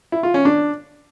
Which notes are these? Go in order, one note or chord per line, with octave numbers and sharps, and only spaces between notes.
E4
F4
C#4
D4